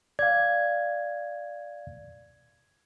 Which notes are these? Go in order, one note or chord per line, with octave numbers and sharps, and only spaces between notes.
D5 F5 G#6